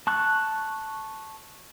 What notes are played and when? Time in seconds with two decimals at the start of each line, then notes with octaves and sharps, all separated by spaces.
0.07 A5 C#6 F#6